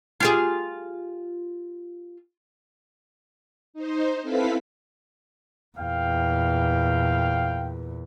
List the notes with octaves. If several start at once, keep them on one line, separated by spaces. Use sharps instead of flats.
F4 G4 G#4
D#4 C5
C4 E4 A4 B4 F5 B6
E2 A#2 F5 G5